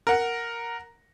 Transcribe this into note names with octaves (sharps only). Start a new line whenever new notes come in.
A#4 F#5